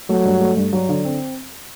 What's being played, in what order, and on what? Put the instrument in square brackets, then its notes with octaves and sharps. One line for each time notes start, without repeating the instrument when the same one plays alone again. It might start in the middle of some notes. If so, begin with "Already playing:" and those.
[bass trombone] F#3 [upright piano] A3
[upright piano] G2
A3
G2
F#3
D3
C4